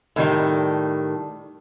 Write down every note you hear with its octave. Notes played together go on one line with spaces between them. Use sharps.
A2 D#3 G3